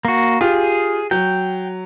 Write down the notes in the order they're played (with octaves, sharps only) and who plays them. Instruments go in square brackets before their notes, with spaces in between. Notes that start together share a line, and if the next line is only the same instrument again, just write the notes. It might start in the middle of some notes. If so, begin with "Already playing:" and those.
[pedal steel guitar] A#3 F#4
[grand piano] F4 G4 [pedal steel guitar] G#4
[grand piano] F#3 [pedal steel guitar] G5